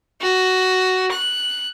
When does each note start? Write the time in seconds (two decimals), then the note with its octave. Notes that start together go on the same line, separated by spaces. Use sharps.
0.21 F#4
1.11 F#6